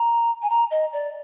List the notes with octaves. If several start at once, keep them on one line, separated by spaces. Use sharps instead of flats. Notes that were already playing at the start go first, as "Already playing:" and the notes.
Already playing: A#5
G#5
A#5
D#5
D5